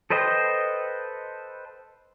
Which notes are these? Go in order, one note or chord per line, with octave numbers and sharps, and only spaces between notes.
A4 B4 C5 D#5 G5